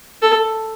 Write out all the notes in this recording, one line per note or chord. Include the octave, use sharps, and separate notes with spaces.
A4